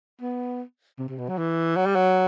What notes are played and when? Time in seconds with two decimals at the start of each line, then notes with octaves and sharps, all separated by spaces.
0.21 B3
0.99 C3
1.09 C3
1.18 B2
1.29 F#3
1.38 E3
1.76 F#3
1.86 G3
1.95 F#3